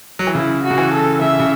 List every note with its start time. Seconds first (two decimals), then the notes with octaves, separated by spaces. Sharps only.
0.19 F#3
0.27 E3
0.34 C#3 E4
0.64 F#4
0.71 C#3
0.78 E3
0.93 A4
1.21 C#3 E5
1.40 C#3